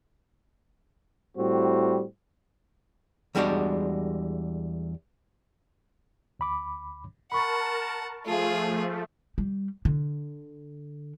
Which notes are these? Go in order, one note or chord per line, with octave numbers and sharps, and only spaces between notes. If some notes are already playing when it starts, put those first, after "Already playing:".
A2 G3 C4 F#4
E2 G3 G#3 D4 F#4 G4
D2 B5 D6
A#4 F#5 A5 B5 C#6
F3 A3 F4 G#4
G3
D3